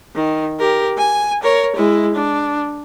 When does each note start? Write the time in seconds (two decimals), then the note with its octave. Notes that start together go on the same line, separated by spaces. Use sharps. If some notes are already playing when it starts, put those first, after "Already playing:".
0.15 D#3
0.59 G4 A#4
0.98 G#5
1.43 A#4 C#5
1.76 G#3 E4
2.14 D4